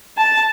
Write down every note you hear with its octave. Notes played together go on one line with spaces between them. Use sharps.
A5